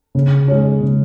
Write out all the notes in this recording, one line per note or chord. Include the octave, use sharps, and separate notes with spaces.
C#3
G#3 C#4
C#3